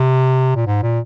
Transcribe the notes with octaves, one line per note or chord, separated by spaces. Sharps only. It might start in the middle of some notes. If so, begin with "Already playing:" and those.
Already playing: C3
A#2
G#2
A#2